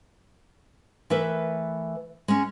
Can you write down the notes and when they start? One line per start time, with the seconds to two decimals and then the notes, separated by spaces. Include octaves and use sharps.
1.10 E3 A3 A#4 B4 E5
2.28 G#3 C#4